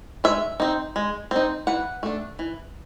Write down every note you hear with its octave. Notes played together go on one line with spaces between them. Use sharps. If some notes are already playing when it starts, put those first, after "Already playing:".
G#3 E5
C4 D#4
G#3
C4 D#4
E3 F#5
A3 D4
E3